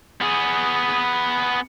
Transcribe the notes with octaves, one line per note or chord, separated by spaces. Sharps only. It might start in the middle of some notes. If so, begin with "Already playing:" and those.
B3 G#4